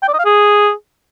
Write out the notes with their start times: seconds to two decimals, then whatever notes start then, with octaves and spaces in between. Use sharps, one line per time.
0.02 G5
0.08 D5
0.14 D#5
0.19 F5
0.25 G#4